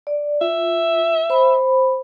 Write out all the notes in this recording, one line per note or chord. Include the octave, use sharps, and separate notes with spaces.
D5
F4 E5
C5 B5